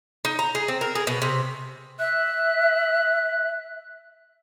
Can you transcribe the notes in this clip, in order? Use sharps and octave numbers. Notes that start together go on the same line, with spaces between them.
D#4
A#5
G#4
C4
A#4
G#4
B2
C3
E5 F#6